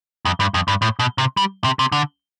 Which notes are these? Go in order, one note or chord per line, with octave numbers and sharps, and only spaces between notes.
F2
G2
F2
G2
A2
B2
C3
G3
C3
C3
D3